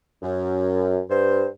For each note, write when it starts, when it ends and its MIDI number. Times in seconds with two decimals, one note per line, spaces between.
0.22 1.01 42
1.10 1.46 43
1.10 1.46 72